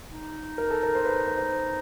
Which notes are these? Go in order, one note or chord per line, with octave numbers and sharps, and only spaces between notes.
D#4
A#4
A4
A#4
C5
B4
B4
C5